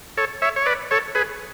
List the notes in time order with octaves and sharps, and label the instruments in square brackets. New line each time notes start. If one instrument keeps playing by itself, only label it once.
[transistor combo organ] A4 C#5
C#5 E5
C#5
B4 D5
A4 C#5
G#4 B4